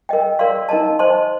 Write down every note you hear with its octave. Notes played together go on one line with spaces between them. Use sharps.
A#4 D#5 G5
A#4 D5 F5 C6
D#4 A#4 D#5 A5
C5 D#5 A5 C6